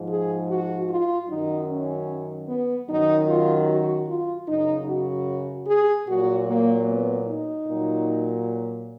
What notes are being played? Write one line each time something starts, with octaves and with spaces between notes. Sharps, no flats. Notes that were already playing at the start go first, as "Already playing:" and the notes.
Already playing: G#2 F3
G#4
F#4
F4
F#2 D#3 F#3 D#4
C#4
B3
F#2 D#3 F#3 D#4
F4
F#4
F4
F#2 C#3 F#3 D#4
F#4
G#4
A#2 F#3 F#4
A#3
B3
D#4
A#2 F#3